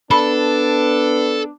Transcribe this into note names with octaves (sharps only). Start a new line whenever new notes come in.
B3 D4 A4 B5